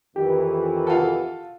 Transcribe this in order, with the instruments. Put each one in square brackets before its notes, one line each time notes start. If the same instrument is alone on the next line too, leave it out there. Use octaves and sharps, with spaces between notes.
[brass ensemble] F2 D#3 E3 [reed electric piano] G4
[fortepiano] F4 F#4 A4